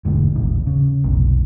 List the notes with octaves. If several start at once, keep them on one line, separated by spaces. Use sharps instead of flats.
E1 D2 G#2
D#1 A1
C#3
F1 B1